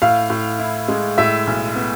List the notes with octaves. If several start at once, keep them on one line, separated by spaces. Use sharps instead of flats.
A2 F5
A2
E4
G#3
A2 E5
B1
B3